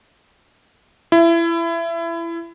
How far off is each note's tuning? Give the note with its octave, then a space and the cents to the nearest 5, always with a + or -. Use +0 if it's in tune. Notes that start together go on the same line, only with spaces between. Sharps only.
E4 +25